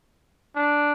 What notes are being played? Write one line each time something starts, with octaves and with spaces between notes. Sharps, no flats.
D4